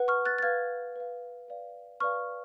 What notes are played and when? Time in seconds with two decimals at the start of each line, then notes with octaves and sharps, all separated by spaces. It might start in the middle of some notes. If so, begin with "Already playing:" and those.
Already playing: B4 F#5
0.08 C#6 F6
0.25 F#6 A6
0.38 A6
0.43 B4 F5 F6 G#6
0.96 B4 F5
1.48 B4 D5 F5
2.00 B4 D5 F5 C#6 F6